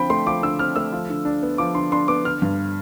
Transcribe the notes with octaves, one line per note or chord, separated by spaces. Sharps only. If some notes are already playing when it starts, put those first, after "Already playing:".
Already playing: D3 F3 C4 G5 B5
A3 C6
F3 D6
D3 E6
C4 F6
A3 E6
F3
D3
D4
B3
F3 D6
D3 C6
D4 C6
B3 D6
D3 F6
G2